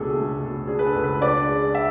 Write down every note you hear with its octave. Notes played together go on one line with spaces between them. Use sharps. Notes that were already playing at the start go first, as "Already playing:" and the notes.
Already playing: C#2 B2 A3 D4 G#4 A4
A3
B2
D4 G#4
B4
A4
C#2
B4
D4 D5
G#3
E5